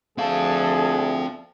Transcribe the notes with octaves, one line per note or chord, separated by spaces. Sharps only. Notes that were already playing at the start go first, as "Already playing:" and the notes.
D2 C4 G#4 A4 F5